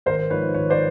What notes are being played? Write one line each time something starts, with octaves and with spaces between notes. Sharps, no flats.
G#1 A#4 C5
G#2 F3 B4 C#5
G#1 B4 C#5
C5 D5